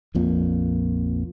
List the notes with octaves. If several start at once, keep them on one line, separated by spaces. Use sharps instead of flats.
A#1 F2 A#2